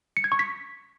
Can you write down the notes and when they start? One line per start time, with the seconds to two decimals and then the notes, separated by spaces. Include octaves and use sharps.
0.17 C#7
0.24 G#6
0.32 C#6
0.39 B6